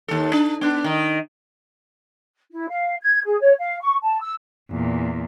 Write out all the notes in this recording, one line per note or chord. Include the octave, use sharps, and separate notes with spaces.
D#2 A4
D4
B3 D4
D#3 D#5
E4
F5
G#6
G#4
C#5
F5
C#6
A5
E6
E2 A#2